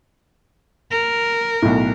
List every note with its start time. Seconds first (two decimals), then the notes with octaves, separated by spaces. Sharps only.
0.92 A#4
1.62 B1 A2